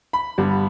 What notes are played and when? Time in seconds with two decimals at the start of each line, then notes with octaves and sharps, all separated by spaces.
0.13 B5
0.38 G2 D3 G3 B3